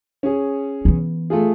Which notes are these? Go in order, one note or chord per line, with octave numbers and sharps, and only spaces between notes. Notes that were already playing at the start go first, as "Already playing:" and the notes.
C#4 G#4
E3 B3
A3 F4 G#4